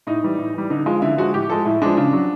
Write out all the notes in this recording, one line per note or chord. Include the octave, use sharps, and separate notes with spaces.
A2 D#4
E3 G3
A2
E3 G3
D3 D#4
F3 G#3 F4
D3 E4
F3 G#3 F#4
A2 G4
F3 G#3 A4
A2 E4
F3 G#3 D4
C#3 D4
F#3